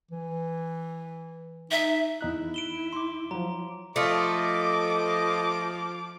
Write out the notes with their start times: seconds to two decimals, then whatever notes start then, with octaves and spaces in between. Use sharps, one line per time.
0.11 E3
1.71 D#4 E5
2.21 E2 D#4 E4 F#6
2.54 D7 E7 G7
2.93 C6 D6
3.31 F3 F#3 A#5
3.96 F3 A3 F4 D#5 D6